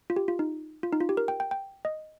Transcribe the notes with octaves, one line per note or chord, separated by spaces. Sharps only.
F4
G4
F4
D#4
F4
D#4
F4
G4
A#4
G5
G5
G5
D#5